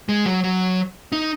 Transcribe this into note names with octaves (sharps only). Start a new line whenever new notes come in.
G#3
F#3
F#3
D#4